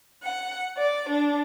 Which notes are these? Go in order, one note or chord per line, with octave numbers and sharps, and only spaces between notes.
F#5
D5
D4